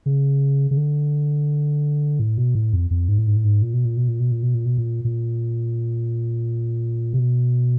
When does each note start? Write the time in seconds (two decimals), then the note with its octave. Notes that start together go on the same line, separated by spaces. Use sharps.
0.06 C#3
0.71 C#3
0.77 D3
2.20 A2
2.37 B2
2.55 A2
2.73 F2
2.91 F2
3.09 G#2
3.18 A2
3.27 G#2
3.36 A2
3.44 G#2
3.62 A#2
3.74 B2
3.85 A#2
3.97 B2
4.08 A#2
4.20 B2
4.32 A#2
4.43 B2
4.54 A#2
4.66 B2
4.78 A#2
5.05 A#2
7.13 C3
7.19 B2